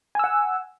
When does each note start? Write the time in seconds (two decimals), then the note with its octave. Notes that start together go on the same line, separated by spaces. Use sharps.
0.15 G#5
0.19 E6
0.24 F#5